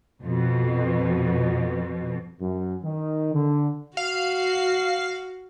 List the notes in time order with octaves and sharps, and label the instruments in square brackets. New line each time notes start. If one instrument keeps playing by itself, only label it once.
[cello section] F2 B2
[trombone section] F#2
D#3
D3
[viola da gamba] F#4 [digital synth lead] F5